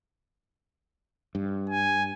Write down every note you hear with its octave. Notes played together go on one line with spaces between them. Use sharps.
G2
G#5